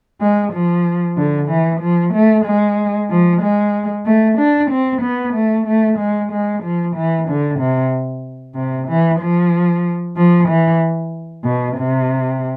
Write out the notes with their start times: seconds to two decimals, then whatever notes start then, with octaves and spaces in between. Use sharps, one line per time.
0.21 G#3
0.54 F3
1.17 D3
1.50 E3
1.81 F3
2.14 A3
2.46 G#3
3.10 F3
3.42 G#3
4.06 A3
4.39 D4
4.71 C4
5.03 B3
5.34 A3
5.67 A3
5.99 G#3
6.32 G#3
6.63 F3
6.96 E3
7.28 D3
7.59 C3
8.57 C3
8.89 E3
9.21 F3
10.17 F3
10.50 E3
11.45 B2
11.77 C3